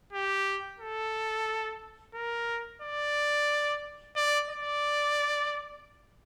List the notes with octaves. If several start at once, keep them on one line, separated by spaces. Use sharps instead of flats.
G4
A4
A#4
D5
D5
D5